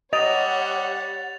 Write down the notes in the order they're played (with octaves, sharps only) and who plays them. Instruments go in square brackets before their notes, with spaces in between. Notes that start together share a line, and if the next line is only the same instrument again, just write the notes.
[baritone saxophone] G3 [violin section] C#5 F#5 [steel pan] D#5 [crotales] A6 F7